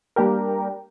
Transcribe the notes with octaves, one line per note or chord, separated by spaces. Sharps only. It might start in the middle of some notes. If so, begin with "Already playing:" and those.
G3 A#3 D4 G4 A#4